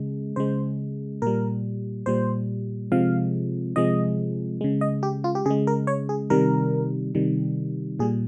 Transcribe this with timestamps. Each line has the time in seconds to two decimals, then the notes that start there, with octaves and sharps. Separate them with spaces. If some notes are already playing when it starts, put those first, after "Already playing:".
Already playing: C#3 G#3
0.36 C#3 G#3 C5
1.22 A#2 G3 A#4
2.06 A#2 G3 C5
2.92 C3 F3 G#3 F5
3.76 C3 F3 G#3 D#5
4.61 C#3 G#3
4.81 D#5
5.03 G4
5.24 F4
5.35 G4
5.45 C#3 G#4
5.50 G#3
5.67 A#4
5.87 C#5
6.09 G#4
6.30 C3 D#3 G3 A#4
7.15 C3 D#3 G3
7.99 A#2 G3 G#4